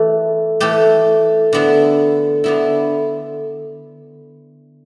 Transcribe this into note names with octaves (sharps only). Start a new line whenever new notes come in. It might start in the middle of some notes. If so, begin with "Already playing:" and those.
Already playing: E3 A3
E3 A3 G4
D3 B3 E4
D3 B3 E4